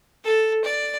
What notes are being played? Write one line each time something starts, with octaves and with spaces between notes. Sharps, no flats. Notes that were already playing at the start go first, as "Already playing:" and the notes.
A4
D5